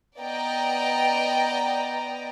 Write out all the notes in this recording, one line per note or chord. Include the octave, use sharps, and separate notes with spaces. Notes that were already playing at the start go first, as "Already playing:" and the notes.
B3 D5 D#5 G5 A#5